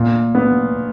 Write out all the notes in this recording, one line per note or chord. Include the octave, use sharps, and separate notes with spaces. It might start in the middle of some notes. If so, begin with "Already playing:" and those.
Already playing: A#2
B3